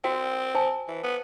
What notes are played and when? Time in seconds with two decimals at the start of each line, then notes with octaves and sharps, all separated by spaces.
0.04 C4 F#4 G5
0.55 C5 G#5 A5
0.88 E3
1.03 B3